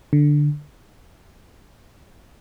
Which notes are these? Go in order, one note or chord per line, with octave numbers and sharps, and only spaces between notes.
D3